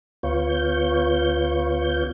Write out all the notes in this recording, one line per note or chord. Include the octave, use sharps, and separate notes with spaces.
D2 B3 F4 C#5 G6